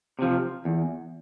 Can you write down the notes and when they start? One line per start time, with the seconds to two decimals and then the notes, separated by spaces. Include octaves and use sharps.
0.19 C3 F3
0.65 E2